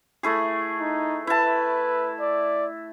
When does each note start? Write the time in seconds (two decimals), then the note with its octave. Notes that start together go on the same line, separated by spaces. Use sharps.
0.23 A3 E4 G#4
0.79 D#4
1.27 E4 B4 A5
2.21 D5